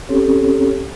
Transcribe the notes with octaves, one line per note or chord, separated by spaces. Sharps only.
C4 C#4 G4 A4 C#5